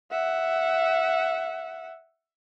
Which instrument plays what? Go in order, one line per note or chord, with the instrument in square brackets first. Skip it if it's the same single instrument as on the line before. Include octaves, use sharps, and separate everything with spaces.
[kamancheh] E5 F#5